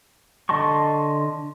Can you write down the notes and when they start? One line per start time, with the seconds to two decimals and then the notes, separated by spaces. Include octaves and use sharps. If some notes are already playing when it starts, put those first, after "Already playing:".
0.49 D3 D#5 A5 C6 C#6